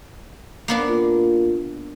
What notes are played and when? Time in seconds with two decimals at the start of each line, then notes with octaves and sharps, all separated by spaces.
0.68 A#3 B3 D4
0.89 A#2